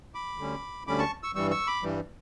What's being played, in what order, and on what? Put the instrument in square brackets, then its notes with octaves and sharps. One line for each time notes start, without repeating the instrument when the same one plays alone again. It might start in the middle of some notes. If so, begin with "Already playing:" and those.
[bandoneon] B5 D6
D2 D3 G3 C#4
D2 D3 G3 C#4 B5 D6
A5 C#6
C#6 E6
G2 E3 G3 C#6 E6
C#6 E6
B5 D6
G2 E3 G3